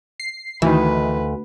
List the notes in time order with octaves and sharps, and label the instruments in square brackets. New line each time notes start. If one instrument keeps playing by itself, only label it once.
[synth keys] C7
[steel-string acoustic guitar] D2 [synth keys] D#3 E3 [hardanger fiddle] B4